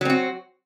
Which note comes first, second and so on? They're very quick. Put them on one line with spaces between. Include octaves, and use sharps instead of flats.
F#3 C4 F#4